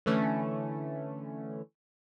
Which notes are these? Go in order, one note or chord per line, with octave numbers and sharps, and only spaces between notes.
D3 E3 A3 C#4